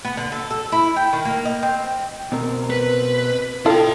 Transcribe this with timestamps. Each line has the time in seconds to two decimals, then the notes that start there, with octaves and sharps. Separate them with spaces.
0.05 B3
0.17 D3
0.32 A4
0.50 A4
0.72 E4
0.96 G5
1.13 D#3
1.25 A#3
1.45 D#5
1.63 C4
2.32 B2 C4 A#4
2.70 B4
3.66 E4 F4 A4 G5